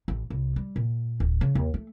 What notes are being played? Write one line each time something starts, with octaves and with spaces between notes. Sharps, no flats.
A1
C2
G3
A#2
D1
C#3
D#2
A3